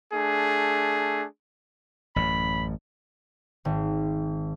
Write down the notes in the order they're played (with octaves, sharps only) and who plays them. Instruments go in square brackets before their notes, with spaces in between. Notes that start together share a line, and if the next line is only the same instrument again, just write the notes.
[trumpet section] A3 D4 G#4
[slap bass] A1 F#2 [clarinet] B5
[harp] G#1